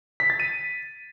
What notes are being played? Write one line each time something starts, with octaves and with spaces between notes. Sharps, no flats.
B6
A6
D#7